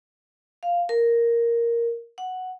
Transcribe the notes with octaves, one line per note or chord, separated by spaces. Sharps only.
F5
A#4
F#5